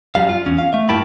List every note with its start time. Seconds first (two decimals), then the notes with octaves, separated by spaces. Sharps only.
0.15 F#2 G3 F5
0.29 F4
0.46 E2 C#4
0.58 F5
0.73 A3 E5
0.89 G2 A#3 E4 G5 A5 B5